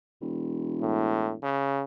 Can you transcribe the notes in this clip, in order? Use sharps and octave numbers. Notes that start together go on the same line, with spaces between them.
E1
A2
C#3